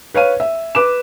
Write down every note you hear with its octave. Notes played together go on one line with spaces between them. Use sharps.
B4 C#5 F5 D#7
E5
B4 D6 E7